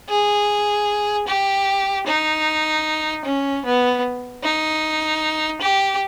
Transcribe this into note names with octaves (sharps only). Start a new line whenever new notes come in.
G#4
G4
D#4
C#4
B3
D#4
G4